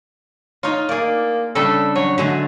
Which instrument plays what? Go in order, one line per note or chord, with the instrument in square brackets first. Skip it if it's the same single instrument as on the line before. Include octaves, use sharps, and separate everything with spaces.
[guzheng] D#4 F4 [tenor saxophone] C#5
[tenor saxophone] A#3 [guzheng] G#4 D5
[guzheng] C#3 G3 D4 [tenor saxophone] A4
[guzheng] F#3 [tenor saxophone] C#5
[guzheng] D3 G#3 A3 [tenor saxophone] F#3